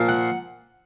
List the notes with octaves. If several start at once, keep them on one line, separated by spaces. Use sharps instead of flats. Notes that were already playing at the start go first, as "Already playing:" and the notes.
Already playing: A#2 F3 A#3
F#5